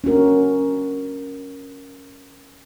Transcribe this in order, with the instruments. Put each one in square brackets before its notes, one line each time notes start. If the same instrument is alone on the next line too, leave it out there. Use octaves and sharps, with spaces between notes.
[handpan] C#4 D4 F#4 A#4